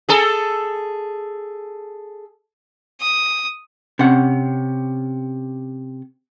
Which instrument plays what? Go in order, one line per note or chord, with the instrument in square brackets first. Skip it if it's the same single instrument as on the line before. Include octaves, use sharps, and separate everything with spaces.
[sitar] G#4 A4
[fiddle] D#6
[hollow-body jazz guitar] C3 C#4 F#5